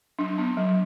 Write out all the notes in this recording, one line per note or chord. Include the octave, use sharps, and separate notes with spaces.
F#3 D4
B3 D4
F#3